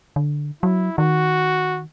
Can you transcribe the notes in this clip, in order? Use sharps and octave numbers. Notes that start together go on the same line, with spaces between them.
D3
F#3 E4
D#3 F#4